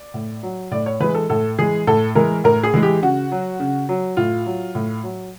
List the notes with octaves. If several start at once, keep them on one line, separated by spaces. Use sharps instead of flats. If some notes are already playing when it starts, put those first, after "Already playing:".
Already playing: D5
A2
F#3
A2 D5
C#5
E3 G#3 B4
A4
A2 A4
E3 G#3 G#4
A2 A4
E3 G#3 A#4
A2 A#4
G#4
E3 G#3
G4
C#3 F#4
F#3
C#3
F#3
A2 F4
F#3
A2
F#3